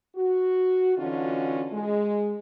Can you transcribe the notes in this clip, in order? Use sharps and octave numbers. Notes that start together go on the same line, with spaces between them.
F#4
D3 E3 C#4 D#4 F4 F#4
G#3